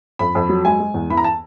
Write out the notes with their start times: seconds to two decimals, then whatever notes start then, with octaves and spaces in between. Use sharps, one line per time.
0.19 F2 B5
0.35 F2
0.49 F#3
0.65 G#3 G#5
0.80 G#3
0.94 E2
1.10 E3 B5
1.17 A#5
1.24 A5